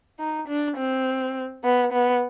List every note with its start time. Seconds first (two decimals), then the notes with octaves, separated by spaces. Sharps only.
0.19 D#4
0.48 D4
0.77 C4
1.64 B3
1.93 B3